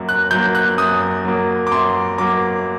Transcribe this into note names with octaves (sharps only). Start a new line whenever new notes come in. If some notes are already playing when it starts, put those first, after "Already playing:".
Already playing: F#2 F#3 A#3
F#6
F#3 A#3 G6
F#6
F#2 D#6
F#3 A#3
D6
F#2 C6
F#3 A#3 D6